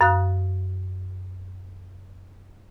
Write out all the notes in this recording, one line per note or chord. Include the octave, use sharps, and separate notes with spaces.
F#2 F5 D#6 F#6